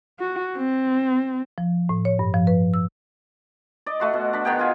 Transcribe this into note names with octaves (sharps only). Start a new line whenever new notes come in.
F#4
C4
F3
A2
C#5
G2
F3
B4
E6
D5 D#5
A3 F#4 C6
B2
D4 B5
D#3 B3 G#4 G5
F4 G#5